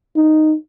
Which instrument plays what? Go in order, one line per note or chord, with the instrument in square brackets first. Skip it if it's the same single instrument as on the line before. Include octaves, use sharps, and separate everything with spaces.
[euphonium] D#4